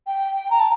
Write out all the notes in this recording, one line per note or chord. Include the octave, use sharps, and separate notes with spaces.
G5
A#5
A5